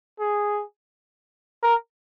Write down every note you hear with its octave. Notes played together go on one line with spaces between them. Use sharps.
G#4
A#4